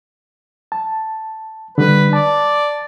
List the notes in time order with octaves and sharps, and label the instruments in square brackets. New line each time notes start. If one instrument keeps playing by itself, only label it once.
[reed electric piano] A5
[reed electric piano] D3 G3 [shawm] B4
[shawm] D5 [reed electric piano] A5